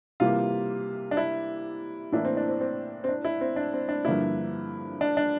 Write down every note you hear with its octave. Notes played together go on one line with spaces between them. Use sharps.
C3 E3 G3 A#3 F4
D4
E4
A2 E3 A#3 D4 E4
C4
D4
C4
C4
C4
D4
E4
C4
D4
C4
D4
G2 D3 F3 A#3 E4
D4
D4